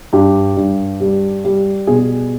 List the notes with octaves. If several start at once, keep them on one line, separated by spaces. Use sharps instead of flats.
G2 G4
G2
G3
G3
B2 G#4